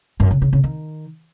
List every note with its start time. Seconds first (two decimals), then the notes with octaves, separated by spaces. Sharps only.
0.20 F#2
0.31 C#3
0.42 C#3
0.53 C#3
0.64 D#3